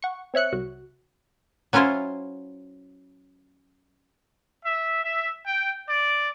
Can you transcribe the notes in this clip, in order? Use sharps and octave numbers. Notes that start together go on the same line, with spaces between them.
F#5 C#6
C4 C#5 E5 F#6 C#7
C2 F#4
F#3 C#4 E4 F4 C5 C#5
E5
E5
G5
D5